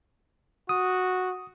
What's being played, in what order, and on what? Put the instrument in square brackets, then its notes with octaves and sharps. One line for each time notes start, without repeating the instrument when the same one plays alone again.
[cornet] F#4 [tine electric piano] D#6